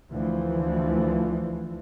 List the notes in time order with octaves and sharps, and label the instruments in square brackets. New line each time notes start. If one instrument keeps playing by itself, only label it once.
[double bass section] D2 E3 F3